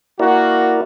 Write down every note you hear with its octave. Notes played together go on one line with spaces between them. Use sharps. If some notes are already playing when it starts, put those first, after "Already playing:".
A#3 E4 F#4 A#4 D5